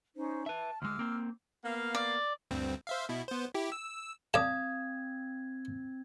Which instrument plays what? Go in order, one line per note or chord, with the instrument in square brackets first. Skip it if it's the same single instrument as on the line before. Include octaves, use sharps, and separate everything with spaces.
[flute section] C#4 D#4 C5
[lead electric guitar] B4 E5 [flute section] A5
[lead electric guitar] D2 G#3 [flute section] D6 E6 F6
[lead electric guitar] A#3 C4
[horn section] A#3 B3 F5
[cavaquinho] D5
[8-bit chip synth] D2 G2 C4
C5 E5 F5
B2 E4
B3 C5
E4 G4
E6
[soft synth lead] C4 [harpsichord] D5 A5 [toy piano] F5 D#6 [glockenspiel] G#6